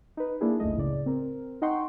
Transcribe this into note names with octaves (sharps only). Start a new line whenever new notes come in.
D#4 B4
A#3 D4 E4 G#4 A#4
G1 C#2 F#2 A3 D#5
A2 C#3 D5
C4 A#4
D#4 D#5 F#5 G5 C6 C#6